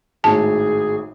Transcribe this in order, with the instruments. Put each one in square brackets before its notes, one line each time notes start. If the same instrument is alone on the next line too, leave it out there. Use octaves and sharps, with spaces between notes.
[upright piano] G#1 A2 [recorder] G#4 [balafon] A5